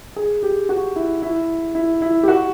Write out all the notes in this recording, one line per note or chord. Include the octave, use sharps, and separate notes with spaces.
G#4
G4
F#4
E4
E4
E4
E4
G4
F#4